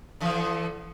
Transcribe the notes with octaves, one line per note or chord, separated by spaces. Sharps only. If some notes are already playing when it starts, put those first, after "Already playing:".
D3 E3 F3